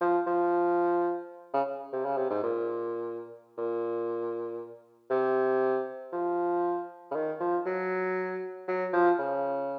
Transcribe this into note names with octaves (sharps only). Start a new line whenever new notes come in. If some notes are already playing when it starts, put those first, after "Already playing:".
F3
F3
C#3
C3
C#3
C3
G#2
A#2
A#2
C3
F3
C#3
D#3
F3
F#3
F#3
F3
C#3